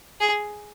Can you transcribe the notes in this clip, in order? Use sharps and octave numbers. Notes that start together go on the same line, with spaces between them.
G#4